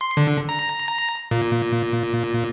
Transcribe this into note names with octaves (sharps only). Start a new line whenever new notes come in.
C6
D3
A#5
A#5
A#2